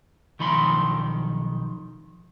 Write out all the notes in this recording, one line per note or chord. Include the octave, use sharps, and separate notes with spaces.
B1 D#3 F3 B5 C6